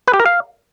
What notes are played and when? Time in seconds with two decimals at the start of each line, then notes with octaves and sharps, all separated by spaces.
0.08 B4
0.14 G4
0.20 A#4
0.26 F5